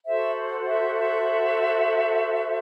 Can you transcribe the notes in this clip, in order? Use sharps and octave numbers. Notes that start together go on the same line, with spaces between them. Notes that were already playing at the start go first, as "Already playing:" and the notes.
F#4 A4 C5 E5
E5
E5